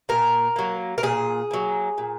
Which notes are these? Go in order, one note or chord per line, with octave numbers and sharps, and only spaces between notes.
A#2 A#4
F#3 A#3
A#4
A#2 G#4
F#3 A#3
A#2